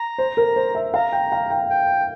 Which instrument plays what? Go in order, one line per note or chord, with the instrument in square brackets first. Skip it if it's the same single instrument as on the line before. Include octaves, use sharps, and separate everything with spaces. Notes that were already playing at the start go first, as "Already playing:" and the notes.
Already playing: [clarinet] A#5
[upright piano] C5
A#4
C5
E5
[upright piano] F5 [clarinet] A#5
[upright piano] G5
F5
G5
[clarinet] G5